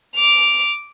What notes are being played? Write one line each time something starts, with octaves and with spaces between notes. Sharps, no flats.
D6 F7